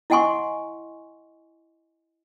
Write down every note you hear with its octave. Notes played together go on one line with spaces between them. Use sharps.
E4 D#5 F#5 G#5 C6 C#6